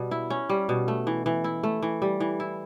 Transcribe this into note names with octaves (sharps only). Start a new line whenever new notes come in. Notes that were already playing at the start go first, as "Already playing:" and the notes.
Already playing: B2 G3
E4
C#4
G3
B2
A3
E3
E3
E4
A3
E3
G3
E3
E4